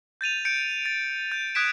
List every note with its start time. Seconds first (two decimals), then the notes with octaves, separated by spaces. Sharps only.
0.21 G6 A6 D#7 F7
0.45 G6 C#7 D7
0.86 A6
1.32 G6
1.55 D#6 F#6 G#6 B6 D7 E7